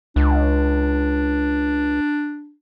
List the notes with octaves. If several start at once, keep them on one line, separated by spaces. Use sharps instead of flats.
C#2 D4